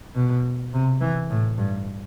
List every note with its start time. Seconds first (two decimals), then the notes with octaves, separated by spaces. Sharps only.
0.15 B2
0.73 C3
1.01 E3
1.30 A2
1.58 G2